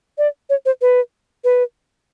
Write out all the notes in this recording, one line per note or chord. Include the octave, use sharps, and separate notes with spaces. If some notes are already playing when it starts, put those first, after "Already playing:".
D5
C#5
C5
B4
B4